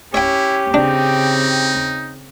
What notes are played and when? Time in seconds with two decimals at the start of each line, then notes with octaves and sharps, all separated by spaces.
0.14 C#4 E4 G4 C#5 G5
0.74 C#3 C4 D4 D#4